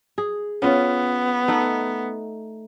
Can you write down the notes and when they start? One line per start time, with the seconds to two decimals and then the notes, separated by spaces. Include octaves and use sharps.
0.18 G#4
0.62 B3 C#4 F4
1.48 A3 D#4 F#5